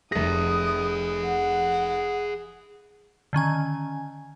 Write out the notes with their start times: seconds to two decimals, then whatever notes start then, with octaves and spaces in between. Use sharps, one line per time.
0.12 F1 G#4 E5 D#6 A#6
1.25 F#5
3.33 D3 D#3 C#4 G#5